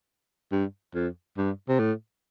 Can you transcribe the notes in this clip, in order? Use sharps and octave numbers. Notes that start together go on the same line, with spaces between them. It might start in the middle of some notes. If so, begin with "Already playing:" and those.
G2
F2
G2
C3
A2